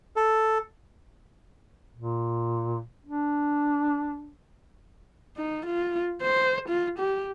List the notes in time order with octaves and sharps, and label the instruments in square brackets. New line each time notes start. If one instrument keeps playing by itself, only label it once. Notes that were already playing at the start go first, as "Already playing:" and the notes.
[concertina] A4
[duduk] A#2
D4
[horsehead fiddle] D#4
F4
C5
F4
G4